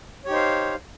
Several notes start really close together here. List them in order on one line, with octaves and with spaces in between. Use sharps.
C#5 G4 D#4 C5 F5